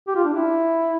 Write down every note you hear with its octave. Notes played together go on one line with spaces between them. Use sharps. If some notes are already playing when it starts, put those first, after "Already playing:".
G4
F4
D4
E4